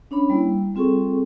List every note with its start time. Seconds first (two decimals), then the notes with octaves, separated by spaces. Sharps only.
0.11 C#4 D4 C#5 B5
0.30 G3 A#3 E4
0.75 G3 C4 F4 G#4 A4 C#6